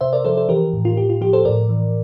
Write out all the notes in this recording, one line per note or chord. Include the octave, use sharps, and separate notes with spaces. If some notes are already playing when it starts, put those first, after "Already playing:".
C3 C5 E5
A#4 D5
F3 A4 C5
A4 C5
E3 G4 A#4
A2
F4
A2 G4
F4
F3 G4
A4 C5
A2 A#4 D5
E3